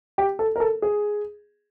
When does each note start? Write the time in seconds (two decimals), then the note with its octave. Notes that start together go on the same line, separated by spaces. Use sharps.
0.18 G4
0.39 A4
0.56 A#4
0.60 A4
0.82 G#4